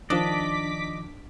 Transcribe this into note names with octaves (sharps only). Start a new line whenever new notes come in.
D#3 F3 D4 D5 D#5 D6 B6